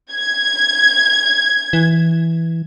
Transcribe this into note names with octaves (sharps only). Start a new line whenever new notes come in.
G#6
E3